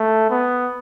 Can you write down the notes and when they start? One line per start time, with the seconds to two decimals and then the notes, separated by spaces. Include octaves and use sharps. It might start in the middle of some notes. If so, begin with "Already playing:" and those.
Already playing: A3
0.30 B3